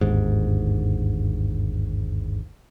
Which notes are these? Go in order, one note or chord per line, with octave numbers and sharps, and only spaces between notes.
G1 D#2 G#2